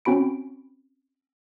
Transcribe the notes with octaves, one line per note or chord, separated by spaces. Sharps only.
C4 C#4 F#4 B5 D7